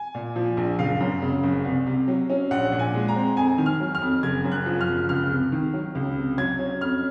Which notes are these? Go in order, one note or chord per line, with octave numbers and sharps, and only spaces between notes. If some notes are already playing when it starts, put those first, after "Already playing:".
Already playing: G#5
A#2
F3
A#1
F#1 F5
F#2
C#3
F#1
C2
C3
F#3
C#4
A#1 F#5
A#2
G#5
G#3
A#5
C4
F2 G#5
D#3
F6
F#3
F6
F2
F#1 G#6
F#2
F#6
F3
F6
F#1
C#2 F6
C3
D#3
F#3
C#2
C3
F#3 G#6
C#4
F2 F6